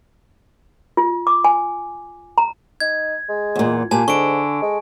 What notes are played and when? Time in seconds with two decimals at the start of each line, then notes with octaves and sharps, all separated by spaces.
0.97 F4
1.27 D6
1.45 G#5
2.38 A#5
2.80 D#4 G#6
3.29 G#3
3.55 E2 A#2
3.91 A#2 G4 G#5 A5
4.08 G#2 D3 C#6 D7
4.62 G#3